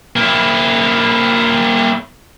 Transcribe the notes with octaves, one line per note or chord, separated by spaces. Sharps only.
A#3 E4